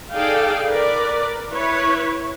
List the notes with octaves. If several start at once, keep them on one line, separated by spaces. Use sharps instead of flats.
D#4 G#4 A4 D5 F5 G5
A#4 B4 D5
E4 B4 C#5